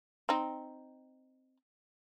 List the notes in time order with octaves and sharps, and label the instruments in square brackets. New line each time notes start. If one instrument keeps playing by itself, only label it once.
[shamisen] C4 D#4